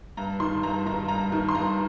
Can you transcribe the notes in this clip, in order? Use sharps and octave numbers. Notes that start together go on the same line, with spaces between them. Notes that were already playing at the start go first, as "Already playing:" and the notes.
G2 A#5
D#3 C6
G2 A#5
D#3 A#5
G2 A#5
D#3
C6
G2 A#5